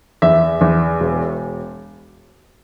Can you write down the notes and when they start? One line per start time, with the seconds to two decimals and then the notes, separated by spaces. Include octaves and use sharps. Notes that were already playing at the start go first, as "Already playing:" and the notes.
0.22 E2 E5
0.61 E2
1.00 E1